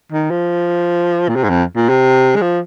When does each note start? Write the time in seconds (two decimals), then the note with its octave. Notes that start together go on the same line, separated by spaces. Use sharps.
0.12 D#3
0.30 F3
1.28 A#2
1.35 C3
1.44 G#2
1.49 F2
1.76 A#2
1.89 C3
2.35 G#3
2.41 F3